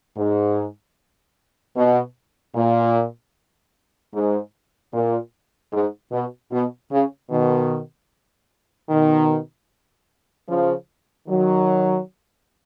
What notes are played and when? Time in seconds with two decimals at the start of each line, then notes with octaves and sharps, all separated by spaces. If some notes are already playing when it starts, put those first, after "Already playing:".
0.16 G#2
1.76 B2
2.55 A#2
4.14 G#2
4.93 A#2
5.73 G#2
6.11 B2
6.52 B2
6.91 C#3
7.30 B2 D#3
8.89 B2 D#3
10.48 C#3 F3
11.27 D#3 F#3